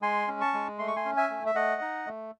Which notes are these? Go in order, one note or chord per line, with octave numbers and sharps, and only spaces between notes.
G#3 G#5 C6
C#4
A5 C#6
G#3
A3 C6
C#6
G#5 C6
C#4
E5 G#5
A3
E5
A3 D#5 F#5
D#4
A3